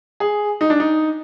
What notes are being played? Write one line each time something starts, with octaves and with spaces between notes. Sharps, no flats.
G#4
D#4
D4
D#4